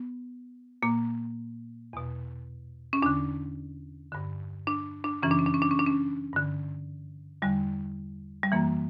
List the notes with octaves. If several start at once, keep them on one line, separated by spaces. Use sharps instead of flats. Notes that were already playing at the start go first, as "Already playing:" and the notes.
Already playing: B3
A#2 A#3
E2 B2
C#4
E2 D3 D4
G2 D3
D4
D4
F#2 C#3 E3 C#4
D4
C#4
D4
C#4
D4
C#4
D4
C#4
G2 D3
E2 D3 G3
G3
F#2 E3 A#3